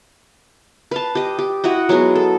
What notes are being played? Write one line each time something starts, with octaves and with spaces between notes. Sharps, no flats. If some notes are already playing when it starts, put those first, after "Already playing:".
B4 F5 A5
G4 D#5
G4
E4 F#4 D#5 F#5
F#3 G#3 B3 F#4
A4